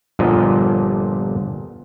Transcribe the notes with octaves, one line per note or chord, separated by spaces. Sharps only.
G1 A#2 D3 F3 D#5